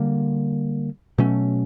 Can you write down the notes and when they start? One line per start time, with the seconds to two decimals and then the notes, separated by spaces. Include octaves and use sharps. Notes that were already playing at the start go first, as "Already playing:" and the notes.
Already playing: D3 G3 A#3
1.18 B2 F#3 A3 C#4